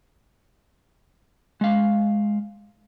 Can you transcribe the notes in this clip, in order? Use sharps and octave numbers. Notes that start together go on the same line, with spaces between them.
G#3 F5